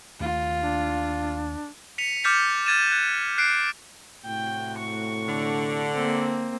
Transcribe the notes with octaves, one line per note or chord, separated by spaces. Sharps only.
D#2 A3 F4
D4
B6 C#7 D#7 F7
D6 F6 G6 A6 B6 C#7
F6 G#6 A6 D#7 E7
F#6 G#6
F#6 C7 D7
A2 C3 F#4 G5
C#6
D3
A#3 C4